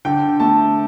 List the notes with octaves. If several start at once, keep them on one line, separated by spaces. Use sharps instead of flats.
D3 G5
A3 A5